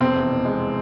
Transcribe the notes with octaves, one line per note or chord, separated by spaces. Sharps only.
F1 C4
E2
B2
G#3